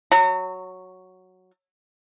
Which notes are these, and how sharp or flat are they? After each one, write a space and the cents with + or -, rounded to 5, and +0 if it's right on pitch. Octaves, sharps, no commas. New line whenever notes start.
F#3 +0 A#5 -35